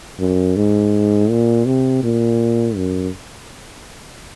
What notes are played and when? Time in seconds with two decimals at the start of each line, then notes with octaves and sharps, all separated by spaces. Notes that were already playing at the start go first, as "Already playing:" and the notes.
0.20 F#2
0.57 G#2
1.30 A#2
1.66 C3
2.03 A#2
2.77 F#2